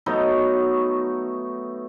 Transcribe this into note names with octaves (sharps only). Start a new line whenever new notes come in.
F#3 A3 B3 D#4